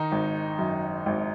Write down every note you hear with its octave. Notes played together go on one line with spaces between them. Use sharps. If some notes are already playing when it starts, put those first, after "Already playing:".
Already playing: D#3 D#4
G#1
F#2
G#1